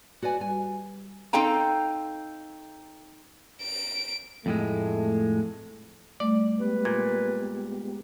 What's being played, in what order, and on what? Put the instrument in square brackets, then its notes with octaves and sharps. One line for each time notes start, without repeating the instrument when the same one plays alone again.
[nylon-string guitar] F#4 B4 D5 G#5
G3 G#5
[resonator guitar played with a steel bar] C4 D#4 A4 F5 G5 A#5
[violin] D7
[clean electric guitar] F2 A2 G#3 [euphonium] A3
[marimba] G3 A3 [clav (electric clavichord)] D5
[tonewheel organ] G#3 B3 G4 [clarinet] B4
[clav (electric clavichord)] A#2 [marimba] G#6